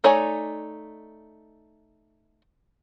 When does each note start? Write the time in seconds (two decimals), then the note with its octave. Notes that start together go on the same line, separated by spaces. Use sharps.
0.04 A3 D#4 C#5 D5 G#5